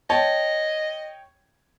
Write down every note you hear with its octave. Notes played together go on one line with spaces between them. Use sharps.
C#5 D#5 G5 A5